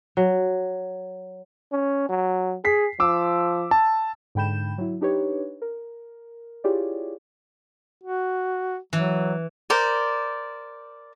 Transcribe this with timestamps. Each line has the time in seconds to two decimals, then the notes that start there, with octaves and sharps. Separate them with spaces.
0.17 F#3
1.72 C#4
2.09 F#3
2.65 G#4 B6 C7
3.00 F3 D6 E6
3.71 A5
4.35 G#2 D3 G5 B5 G6 E7
4.78 F#3 E4
5.01 D4 D#4 G4 B4 C#5
5.62 A#4
6.64 E4 F4 G4 G#4 C#5 D5
8.04 F#4
8.93 E3 F#3
9.70 A#4 C5 D5